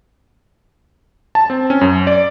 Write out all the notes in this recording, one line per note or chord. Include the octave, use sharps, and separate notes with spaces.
A5
C4
C#4
F#2
D5